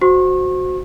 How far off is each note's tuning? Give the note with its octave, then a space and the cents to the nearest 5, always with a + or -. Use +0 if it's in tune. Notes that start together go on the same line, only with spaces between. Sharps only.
F#4 -5 C5 +0 C#6 -35